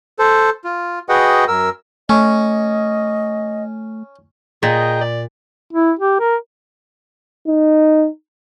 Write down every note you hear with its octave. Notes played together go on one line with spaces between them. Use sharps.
A4 C5
F4
F#4 G#4 B4 D#5 F#5 G5
F#2 A#4 E6
A3 C#4 D#5
A#2 G#4 D#5 G5 A#5
D5
E4
G4
A#4
D#4